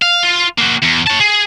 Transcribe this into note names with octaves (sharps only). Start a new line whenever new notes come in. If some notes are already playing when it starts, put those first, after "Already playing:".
F5
F4
A#3 F#4
E2
C#5 A5
G#4